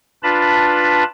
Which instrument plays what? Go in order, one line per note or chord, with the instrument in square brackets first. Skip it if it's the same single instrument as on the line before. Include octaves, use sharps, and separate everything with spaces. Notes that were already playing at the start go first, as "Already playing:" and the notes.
[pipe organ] D4 F4 B4 A5 B5